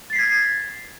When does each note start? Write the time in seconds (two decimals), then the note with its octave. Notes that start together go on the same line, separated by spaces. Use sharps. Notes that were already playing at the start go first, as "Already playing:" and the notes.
0.10 A6
0.13 C7
0.16 B6
0.18 G#6